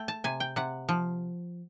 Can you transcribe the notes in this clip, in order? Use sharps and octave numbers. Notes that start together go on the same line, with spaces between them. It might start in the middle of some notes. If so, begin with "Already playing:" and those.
Already playing: A3 G5
A5
C3 G#5
G5
C3 F#5
F3